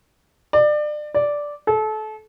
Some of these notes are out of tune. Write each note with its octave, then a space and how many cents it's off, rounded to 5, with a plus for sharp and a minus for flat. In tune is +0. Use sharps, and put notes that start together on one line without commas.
D5 +30
D5 -5
A4 -30